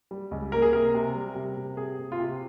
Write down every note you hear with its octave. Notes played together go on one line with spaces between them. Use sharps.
G3
C#2
A#3 A#4
G#4
C3 A#4
C3
G3
C3
C3
C3 G#4
C3
F4
C3 G4